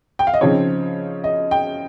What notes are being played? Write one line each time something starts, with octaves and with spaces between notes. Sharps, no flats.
G5
F5
D#5
C#3 F3 C4 D#4 C#5
D#5
G5